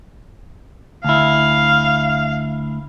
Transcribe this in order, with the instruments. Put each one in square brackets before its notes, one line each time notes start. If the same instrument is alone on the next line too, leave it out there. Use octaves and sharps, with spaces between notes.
[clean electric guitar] D2 E4 [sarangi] F5